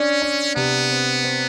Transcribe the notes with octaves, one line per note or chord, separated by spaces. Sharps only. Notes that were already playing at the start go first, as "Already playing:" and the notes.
Already playing: C#4 D4
D4
C3 B3
C4
C4